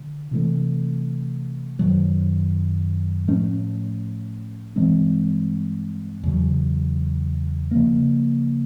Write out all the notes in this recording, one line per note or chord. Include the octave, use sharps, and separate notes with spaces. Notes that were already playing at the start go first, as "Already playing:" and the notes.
Already playing: D3
C3 E3 A3
F#2 D#3 F#3
A2 F3 A3 C#4
G2 E3 G#3 C4
E2 C#3 F#3
C#3 F3 A#3